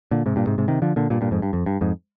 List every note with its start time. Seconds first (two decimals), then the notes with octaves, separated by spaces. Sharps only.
0.11 A#2 D3
0.26 G#2 C3
0.36 G2 A#2
0.47 G#2 C3
0.58 G#2 C3
0.68 C3 D#3
0.82 D3 F3
0.96 A#2 D3
1.10 G2 A#2
1.21 G2 A#2
1.31 F2 G#2
1.42 G2
1.53 F2
1.66 G2
1.81 F2 G#2